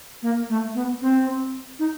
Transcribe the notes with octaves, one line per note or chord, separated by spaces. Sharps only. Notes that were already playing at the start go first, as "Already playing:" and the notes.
A#3
A3
B3
C4
D#4